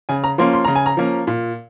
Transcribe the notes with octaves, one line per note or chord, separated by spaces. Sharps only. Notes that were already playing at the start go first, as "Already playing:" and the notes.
C#3 G#5
A#5
F3 A#3 C#4 C6
C6
C#3 A#5
G#5
A#5
F3 A#3 C#4
A#2